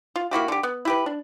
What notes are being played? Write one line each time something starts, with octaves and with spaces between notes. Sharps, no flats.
F4
A#3 E4 F#4 G4
D3 G4
B3
E4 G4 B4
D4